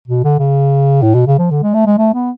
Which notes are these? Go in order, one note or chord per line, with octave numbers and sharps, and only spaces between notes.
B2
D3
C#3
A2
B2
C#3
F3
D3
G#3
A3
G#3
A3
B3